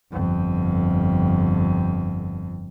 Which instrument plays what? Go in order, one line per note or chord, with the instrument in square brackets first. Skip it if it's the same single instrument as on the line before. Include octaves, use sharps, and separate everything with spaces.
[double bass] G1 F2